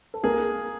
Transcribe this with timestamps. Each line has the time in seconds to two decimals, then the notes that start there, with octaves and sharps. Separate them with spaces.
0.14 A4
0.23 A#3 G#4 A#4